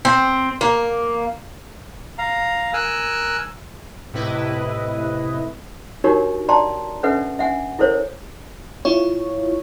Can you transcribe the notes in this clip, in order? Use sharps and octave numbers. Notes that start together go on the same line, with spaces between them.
C4
A#3
F5 A#5
A#4 G#5 E6 F#6
A2 C3 E4 B4 D#5
D4 D#4 F#4 G4 A#4 C#5
D5 G5 A5 A#5 C6
C#4 D4 A4 B4 E5 F#5
E5 F#5 G#5
E4 A4 A#4 C5 C#5
E4 F4 C#5